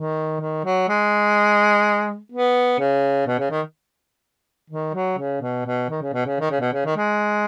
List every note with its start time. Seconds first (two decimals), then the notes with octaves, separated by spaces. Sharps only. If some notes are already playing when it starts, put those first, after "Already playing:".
Already playing: D#3
0.40 D#3
0.65 F#3
0.88 G#3
2.32 B3
2.79 C#3
3.27 B2
3.39 C#3
3.50 D#3
4.70 D#3
4.94 F#3
5.18 C#3
5.41 B2
5.66 B2
5.90 D#3
6.02 C#3
6.13 B2
6.26 C#3
6.40 D#3
6.51 C#3
6.61 B2
6.73 C#3
6.85 D#3
6.97 G#3